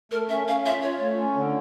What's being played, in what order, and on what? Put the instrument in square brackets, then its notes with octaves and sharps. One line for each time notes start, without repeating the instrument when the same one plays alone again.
[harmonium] A3 [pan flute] A#4
[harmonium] C#4 [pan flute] E5
[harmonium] C#4 [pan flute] F5
[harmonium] F4 [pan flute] E5
[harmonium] F4 [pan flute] C#5
[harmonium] A3
C#4
D3